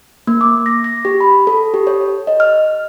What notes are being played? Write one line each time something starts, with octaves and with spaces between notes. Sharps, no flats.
A#3
D6
A#6
A#6
G4
B5
A4
G4
C#5
D#5
F6